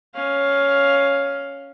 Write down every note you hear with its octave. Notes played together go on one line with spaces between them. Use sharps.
C#4 F5